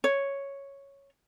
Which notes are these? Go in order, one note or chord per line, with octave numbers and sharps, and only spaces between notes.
C#5